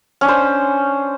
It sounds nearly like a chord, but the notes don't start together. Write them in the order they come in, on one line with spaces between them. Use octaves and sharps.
C#4 D4 C5